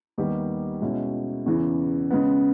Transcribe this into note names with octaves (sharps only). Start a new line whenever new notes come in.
D#2 D#3 G3 B3 G4
B2 G#3 C#4 E4
E2 C#3 E3
C#3 G#3 B3